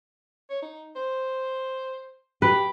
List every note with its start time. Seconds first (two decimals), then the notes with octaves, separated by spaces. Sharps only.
0.50 C#5
0.62 D#4
0.96 C5
2.42 G4 B4